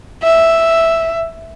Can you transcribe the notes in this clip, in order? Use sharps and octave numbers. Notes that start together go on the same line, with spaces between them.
E5